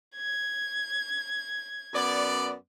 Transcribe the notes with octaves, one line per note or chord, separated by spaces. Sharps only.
G#6
F#2 B3 D5